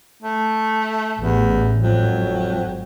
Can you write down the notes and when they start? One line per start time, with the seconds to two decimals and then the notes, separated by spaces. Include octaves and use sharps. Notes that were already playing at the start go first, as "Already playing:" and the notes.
0.23 A3
1.20 A1 E2
1.82 G#1 F2 F#3